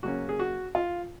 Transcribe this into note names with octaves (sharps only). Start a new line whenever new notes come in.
C#3 F#3 A#3 C#4 F#4
G#4
F#4
F4